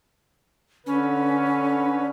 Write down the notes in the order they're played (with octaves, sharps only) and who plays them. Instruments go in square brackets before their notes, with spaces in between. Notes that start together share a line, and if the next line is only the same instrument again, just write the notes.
[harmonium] D3 B4 [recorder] C#4